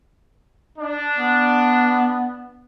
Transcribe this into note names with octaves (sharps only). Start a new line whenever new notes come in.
D4
B3